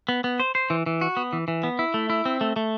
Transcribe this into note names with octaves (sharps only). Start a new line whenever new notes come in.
B3
B3
C5
C5
E3
E3
F#4
B3
E3
E3
B3
E4
A3
E4
C4
A3
A3